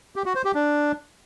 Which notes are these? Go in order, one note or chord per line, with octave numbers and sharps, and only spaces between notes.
G4
F#4
C5
G4
D4